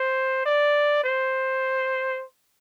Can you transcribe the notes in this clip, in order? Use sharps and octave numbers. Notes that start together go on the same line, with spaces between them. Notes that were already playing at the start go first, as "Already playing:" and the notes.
Already playing: C5
D5
C5